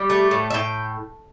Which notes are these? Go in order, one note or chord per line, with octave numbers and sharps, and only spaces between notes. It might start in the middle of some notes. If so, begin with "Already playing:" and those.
Already playing: G3 G4
A3
A2
E5
A2 G5